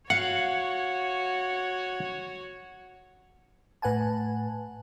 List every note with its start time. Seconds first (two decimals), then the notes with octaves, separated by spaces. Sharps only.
0.10 F#4 C#5 F5 F#5
3.82 A2 B4 F#5 G#5 A5